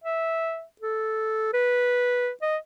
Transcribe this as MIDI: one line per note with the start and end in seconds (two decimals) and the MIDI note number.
0.04 0.63 76
0.81 1.53 69
1.53 2.30 71
2.42 2.57 75